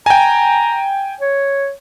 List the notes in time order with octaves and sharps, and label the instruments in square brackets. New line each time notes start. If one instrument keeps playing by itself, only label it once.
[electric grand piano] G5 G#5 [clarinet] A#5
[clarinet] C#5